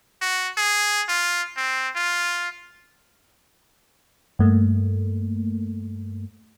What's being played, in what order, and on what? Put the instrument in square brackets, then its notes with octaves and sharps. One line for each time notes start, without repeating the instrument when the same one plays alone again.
[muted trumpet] F#4
G#4
F4
C4
F4
[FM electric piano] G2 A3 A#3